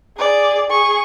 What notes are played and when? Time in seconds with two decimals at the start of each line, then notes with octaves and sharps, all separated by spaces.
0.17 G#4 D5
0.70 G#4 C#6